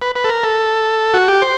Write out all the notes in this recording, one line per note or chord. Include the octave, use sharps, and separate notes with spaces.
B4
B4
A4
A#4
A4
F#4
G4
C5